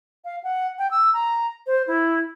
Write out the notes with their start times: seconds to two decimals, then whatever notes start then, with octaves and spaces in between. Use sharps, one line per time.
0.25 F5
0.44 F#5
0.78 G5
0.91 E6
1.14 A#5
1.67 C5
1.87 E4